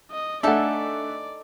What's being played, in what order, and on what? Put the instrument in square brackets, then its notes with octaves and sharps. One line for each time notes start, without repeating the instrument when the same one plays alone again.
[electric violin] D#5
[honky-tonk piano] A3 D4 [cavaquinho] D#4 A4 G#5 [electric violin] D5 [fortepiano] E5 F#5